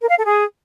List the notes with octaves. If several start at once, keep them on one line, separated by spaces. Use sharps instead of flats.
A#4
F5
A4
G#4